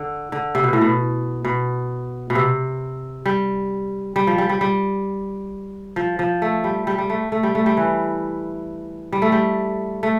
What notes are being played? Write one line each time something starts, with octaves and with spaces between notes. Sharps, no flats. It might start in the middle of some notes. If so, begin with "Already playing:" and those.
Already playing: D3
D3
C3
B2
A2
B2
B2
B2
C3
G3
G3
F3
G3
G3
G3
F3
F3
A3
G3
G3
G3
A3
A3
G3
A3
G3
E3
G3
A3
G3
A3